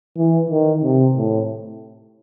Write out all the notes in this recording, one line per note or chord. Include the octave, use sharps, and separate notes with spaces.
E3
D#3
C3
A2